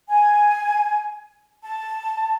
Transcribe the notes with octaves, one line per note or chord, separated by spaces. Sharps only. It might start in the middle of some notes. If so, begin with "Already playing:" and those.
G#5
A5